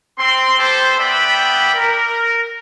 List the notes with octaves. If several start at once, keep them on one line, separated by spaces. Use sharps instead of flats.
C4 C6
B3 G4 A4 C5
B3 D5 E5 F#5 G5 B5
A#4